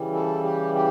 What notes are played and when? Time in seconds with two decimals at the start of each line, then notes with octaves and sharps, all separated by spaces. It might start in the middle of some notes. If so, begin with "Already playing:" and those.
Already playing: C#3 E3 G3
0.13 A4
0.44 G4
0.75 G4